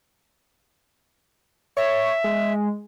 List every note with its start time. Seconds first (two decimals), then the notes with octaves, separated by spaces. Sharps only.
1.77 C#5 E5
2.24 G#3